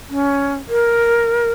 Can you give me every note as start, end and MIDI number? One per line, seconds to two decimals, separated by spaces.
0.09 0.55 61
0.69 1.53 70